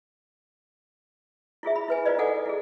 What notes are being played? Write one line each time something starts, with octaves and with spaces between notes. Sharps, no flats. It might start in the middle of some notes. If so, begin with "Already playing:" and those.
E4 F4 G#4 E5
B5
E4 B4 G#5
F4 B4 C5 D5 D#5
D#4 A4 F#5 G#5 D6
E4 G#4